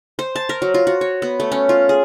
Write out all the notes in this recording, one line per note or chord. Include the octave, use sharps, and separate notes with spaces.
C5
A5
A#4
F#3
F4
F#4
C#5
B3
A3
C#4
F4
G#4